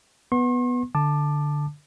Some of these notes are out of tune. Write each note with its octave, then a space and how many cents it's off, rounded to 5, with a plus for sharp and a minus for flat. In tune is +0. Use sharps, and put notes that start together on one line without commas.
B3 +0 C6 +45
D3 +0 A5 +0 D6 +20